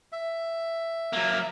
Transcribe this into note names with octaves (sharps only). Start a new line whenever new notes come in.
E5
F#3 A#3